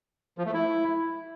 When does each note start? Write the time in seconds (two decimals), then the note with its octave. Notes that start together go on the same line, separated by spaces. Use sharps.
0.38 F3
0.46 A3
0.54 E4